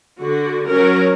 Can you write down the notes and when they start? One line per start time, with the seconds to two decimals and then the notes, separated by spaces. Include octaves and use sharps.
0.20 D3 F#4
0.67 F#3 C#4 A#4